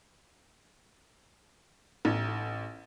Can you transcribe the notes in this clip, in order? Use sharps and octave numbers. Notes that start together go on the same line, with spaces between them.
A1